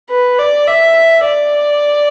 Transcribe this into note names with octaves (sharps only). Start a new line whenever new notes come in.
B4
D5
E5
D5